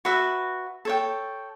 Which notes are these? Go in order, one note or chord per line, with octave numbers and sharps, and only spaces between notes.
F#4 B4 E5
A4 C#5 G5